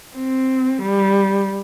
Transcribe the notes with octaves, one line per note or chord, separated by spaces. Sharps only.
C4
G3